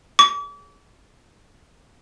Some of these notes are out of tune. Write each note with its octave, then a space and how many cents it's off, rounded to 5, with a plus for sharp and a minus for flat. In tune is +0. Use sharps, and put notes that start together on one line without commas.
D6 -40